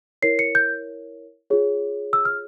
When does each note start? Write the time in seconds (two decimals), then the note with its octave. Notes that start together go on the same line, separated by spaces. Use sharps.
0.22 E4 A#4 C#5 C7
0.39 C#7
0.55 G6
1.50 F4 G#4 C#5
2.13 E6
2.25 F6